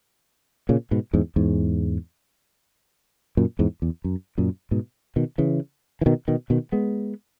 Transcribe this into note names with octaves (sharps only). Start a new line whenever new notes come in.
A#2 C#3
G#2 B2
E2 G#2
E2 G#2
F#2 A#2
E2 G#2
E2
F#2
F#2 A#2
G#2 B2
B2 D#3
C#3 E3
E3
B2 D#3
B2 D#3
B2 D#3
G#3 B3